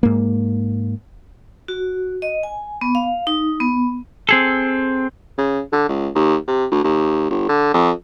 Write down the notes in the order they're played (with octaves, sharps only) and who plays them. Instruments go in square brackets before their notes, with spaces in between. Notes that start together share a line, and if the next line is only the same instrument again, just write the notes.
[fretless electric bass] G#2 A#3
[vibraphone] F#4
D#5
G#5
B3
F5
D#4
B3
[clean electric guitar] C4 G#4 A4
[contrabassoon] C#3
D3
C#2
D#2
C3
D2
D#2
G1
D3
F2